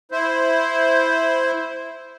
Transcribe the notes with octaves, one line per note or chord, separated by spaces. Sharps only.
E4 C5